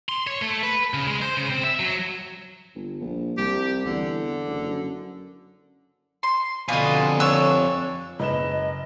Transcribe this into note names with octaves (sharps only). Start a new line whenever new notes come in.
C6
C#5
A3
B4
C#3
G#3
C5
C#3
C4
E5
F#3
G1
A#1
C2 G4
E2 D3
F#1
F#2
C6
F2 B2 D3 D4 F4 D#5 G#5
D4 C#5 E6
F#1 B4 D#5 E7